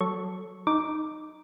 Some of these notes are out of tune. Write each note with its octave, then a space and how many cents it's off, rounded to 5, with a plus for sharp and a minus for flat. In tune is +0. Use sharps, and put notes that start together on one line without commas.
F#3 +0 A4 +0 C#6 +0
D#4 +0 D6 +0